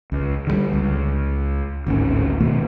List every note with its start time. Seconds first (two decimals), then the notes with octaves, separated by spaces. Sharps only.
0.12 C#2
0.47 D3 E3 G3
0.73 C#2
1.87 G#1 D2 A2 C#4
2.40 B2 D#3 A3 B3